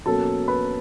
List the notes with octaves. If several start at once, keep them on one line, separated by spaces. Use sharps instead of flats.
B2 F#3 A#3 C#4 A4 A5
B4 B5